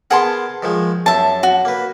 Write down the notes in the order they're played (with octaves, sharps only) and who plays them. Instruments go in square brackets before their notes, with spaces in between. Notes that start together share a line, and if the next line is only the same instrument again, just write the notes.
[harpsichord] B3 G#4 A#4 [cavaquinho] F#5 A5 C6
[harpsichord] D#3 F3 G#3
[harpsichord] F#2 [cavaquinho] E5 A5
[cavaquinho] F#4
[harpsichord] A#3 B4